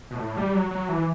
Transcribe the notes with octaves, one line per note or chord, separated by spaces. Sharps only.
B2
A2
G3
F#3
F#3
E3